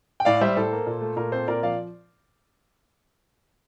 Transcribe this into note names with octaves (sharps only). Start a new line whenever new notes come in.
G5
A2 D5 F5
G3 C5 E5
A2 A4 C5
A#3
A#2
A3
A#2 A#4
C4 A4 C5
A#2 A#4 D5
F3 D5 F5